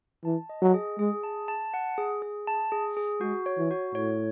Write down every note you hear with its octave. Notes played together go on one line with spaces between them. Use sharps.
E3 A5
D#5
F#3
G#4
G#3 G#4
A5
A5
F#5
G#4
G#4
A5
G#4
G#4
G#3 F#4
C#5
E3
F#4
A2 C#5